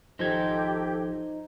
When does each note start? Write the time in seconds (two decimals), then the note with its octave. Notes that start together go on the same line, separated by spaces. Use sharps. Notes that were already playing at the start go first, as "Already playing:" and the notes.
0.19 G#1 F3 D#4 G4 A4 C5 G#6